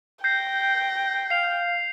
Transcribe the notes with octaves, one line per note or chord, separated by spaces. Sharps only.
G5 G6 A#6 C7
F5 C7 F7